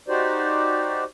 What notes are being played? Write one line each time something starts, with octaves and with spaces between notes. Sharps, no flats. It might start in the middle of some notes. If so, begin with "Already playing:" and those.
D#4 F#4 G4 C5 D5